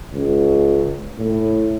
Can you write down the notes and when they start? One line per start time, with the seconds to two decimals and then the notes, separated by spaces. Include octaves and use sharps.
0.13 C#2
1.18 A2